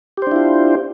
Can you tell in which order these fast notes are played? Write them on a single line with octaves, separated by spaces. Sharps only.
G4 C5 D4 E4 F4